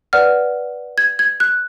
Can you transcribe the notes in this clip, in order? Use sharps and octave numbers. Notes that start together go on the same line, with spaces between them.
B4 D5 F#5 F6
G#6
G#6
F#6